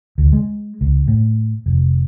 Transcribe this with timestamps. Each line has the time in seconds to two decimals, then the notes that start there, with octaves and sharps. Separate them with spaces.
0.18 D2
0.33 G#3
0.81 C#2
1.08 A2
1.66 F1